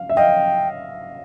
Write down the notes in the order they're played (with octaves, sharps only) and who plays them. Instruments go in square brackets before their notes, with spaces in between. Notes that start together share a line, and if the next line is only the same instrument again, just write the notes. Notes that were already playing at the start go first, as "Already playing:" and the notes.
Already playing: [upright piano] F5
E5
[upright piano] D#5 F5 [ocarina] G5